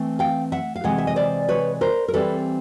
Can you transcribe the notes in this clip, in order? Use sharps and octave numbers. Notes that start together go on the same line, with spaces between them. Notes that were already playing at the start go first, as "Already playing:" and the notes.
Already playing: E3 A3 C4
F5 G5
E5 F#5
F5
C3 E3 G#3 F#5
E5
D#5
C5 D5
B4 C#5
A#4 C5
A#4
E3 G3 C4 A4 B4